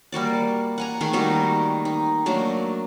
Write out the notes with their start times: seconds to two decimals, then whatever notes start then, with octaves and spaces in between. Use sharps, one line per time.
0.12 G3 A#3 F#4 D5
0.78 F#5 G#5 A#5
1.01 D#3 A3 A#3 G#4
1.13 G3 D#4 F#4 G4
1.85 D#4
2.26 F#3 A3 A#3 D4